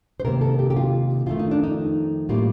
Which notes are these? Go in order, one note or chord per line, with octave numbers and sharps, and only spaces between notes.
C5
C3 D#3 A#3 A#4
A4
G4
G4
F4
F2 D#3 A3 F4
D#4
D4
D#4
A2 G3 A#3 F4